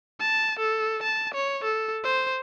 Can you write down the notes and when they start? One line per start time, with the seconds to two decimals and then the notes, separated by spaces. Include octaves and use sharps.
0.20 A5
0.59 A4
1.03 A5
1.34 C#5
1.64 A4
2.04 C5